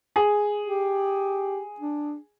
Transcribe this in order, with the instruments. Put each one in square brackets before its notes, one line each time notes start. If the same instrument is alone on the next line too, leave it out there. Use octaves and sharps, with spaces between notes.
[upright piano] G#4
[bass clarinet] G4
D4